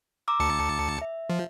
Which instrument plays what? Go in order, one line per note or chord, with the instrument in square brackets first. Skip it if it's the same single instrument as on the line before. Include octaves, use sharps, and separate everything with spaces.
[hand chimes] A#5 D6 E6
[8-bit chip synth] D2 A5 C#7
[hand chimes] E5
[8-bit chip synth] F3